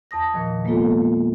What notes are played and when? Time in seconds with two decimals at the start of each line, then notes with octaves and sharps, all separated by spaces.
0.11 E2 A5 D#6 A#6
0.34 A#2 D#3 F3
0.65 G#3 A#3 B3 F4 A4